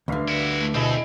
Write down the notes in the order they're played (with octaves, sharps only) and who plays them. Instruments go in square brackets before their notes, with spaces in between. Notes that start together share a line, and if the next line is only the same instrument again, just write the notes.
[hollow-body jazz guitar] D2 D3 [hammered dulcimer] G2 E5 F5
[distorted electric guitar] E4 F#4
[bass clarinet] A3
[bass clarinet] B2 [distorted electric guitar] C4 A4 [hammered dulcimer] E4 G#4 D#5